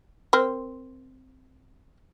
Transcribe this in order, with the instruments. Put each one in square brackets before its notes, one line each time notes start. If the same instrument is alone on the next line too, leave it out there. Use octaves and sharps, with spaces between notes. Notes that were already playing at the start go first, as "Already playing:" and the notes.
[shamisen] C4 A#4 C5